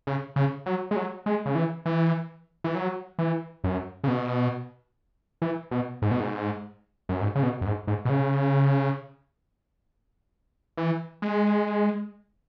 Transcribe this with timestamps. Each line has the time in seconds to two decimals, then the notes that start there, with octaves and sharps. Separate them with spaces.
0.07 C#3
0.36 C#3
0.66 F#3
0.91 G#3
0.96 F#3
1.26 G#3
1.46 C#3
1.55 E3
1.86 E3
2.64 E3
2.75 F#3
3.19 E3
3.64 F#2
4.04 C#3
4.08 B2
5.42 E3
5.71 B2
6.02 G#2
6.11 B2
6.20 G#2
7.09 F#2
7.21 G#2
7.35 C#3
7.43 B2
7.61 F#2
7.66 G#2
7.87 G#2
8.05 B2
8.10 C#3
10.77 E3
11.22 G#3